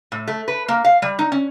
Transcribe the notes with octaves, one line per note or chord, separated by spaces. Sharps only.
A2
A3
B4
A#3
F5
G3
D#4
C#4